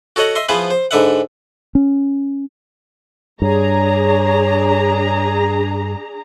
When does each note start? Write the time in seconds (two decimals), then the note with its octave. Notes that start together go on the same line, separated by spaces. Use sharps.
0.16 F#4 A4 C#5 D#5 F#5
0.35 D#5 E5 C6
0.49 F3 B3 E4 G#4 B4 C5
0.70 C5
0.91 G#2 D3 B4 E5 F#5
1.75 C#4
3.42 G2 D4 G#4 C#5 A#5